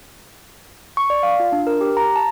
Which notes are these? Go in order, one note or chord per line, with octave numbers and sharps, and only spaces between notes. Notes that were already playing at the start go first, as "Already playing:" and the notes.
C#6
D5
F5
F4
D4
A#4
G4
A#5
A5